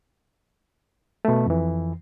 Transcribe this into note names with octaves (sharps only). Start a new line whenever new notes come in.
B2 A3
F2 E3